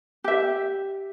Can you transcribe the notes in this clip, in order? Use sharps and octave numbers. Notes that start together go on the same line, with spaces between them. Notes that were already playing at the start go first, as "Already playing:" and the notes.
G4 E5